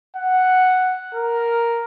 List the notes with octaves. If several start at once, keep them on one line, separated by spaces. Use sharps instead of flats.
F#5
A#4